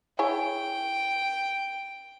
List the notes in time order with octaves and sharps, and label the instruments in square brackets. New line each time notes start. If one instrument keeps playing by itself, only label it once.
[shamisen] E4 G#4 C#5 [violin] G5